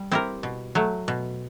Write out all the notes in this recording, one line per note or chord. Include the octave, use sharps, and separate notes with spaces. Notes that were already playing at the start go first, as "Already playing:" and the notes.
Already playing: G3
C4 E4 G4 A#4
B2
F#3 A3
B2